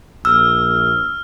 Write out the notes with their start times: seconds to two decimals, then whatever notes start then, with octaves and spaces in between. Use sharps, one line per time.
0.25 A#1 E6 F6